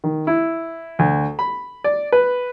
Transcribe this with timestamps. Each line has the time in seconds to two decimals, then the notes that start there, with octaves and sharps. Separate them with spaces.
0.04 D#3
0.27 E4
0.99 D2
1.39 B5
1.84 D5
2.12 B4